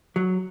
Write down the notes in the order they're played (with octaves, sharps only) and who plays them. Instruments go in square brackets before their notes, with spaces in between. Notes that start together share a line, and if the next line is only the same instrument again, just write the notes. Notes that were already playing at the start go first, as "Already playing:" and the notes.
[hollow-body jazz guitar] F#3